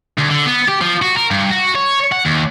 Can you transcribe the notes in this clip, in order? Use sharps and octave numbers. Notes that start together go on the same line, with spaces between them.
D2
D3
B3
G4
F3
F#4
A#4
G2
F#4
C#5
F#5
D#2